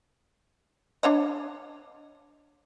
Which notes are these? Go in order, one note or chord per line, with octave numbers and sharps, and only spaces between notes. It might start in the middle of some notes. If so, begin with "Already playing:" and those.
D4 C#5 D#5